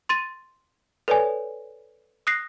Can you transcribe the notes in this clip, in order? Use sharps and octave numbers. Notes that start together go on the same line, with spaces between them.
C6 A6 D#7
A4 B4 C#5 D5 G#5
D#6 F#6 A#6 C7